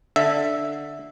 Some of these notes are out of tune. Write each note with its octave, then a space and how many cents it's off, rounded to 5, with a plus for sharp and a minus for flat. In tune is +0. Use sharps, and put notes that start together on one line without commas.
D3 +0 E5 +0